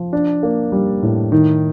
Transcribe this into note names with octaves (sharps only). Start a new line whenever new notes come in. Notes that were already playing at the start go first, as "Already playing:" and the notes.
Already playing: F3
D4
A#3
G3
A2
D#3